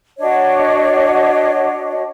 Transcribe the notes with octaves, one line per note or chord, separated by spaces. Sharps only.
D4 F#4 C#5 D#5